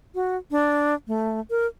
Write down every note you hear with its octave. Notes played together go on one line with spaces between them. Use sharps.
F#4
D4
A3
A#4